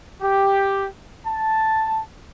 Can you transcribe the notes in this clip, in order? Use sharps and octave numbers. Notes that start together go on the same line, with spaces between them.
G4
A5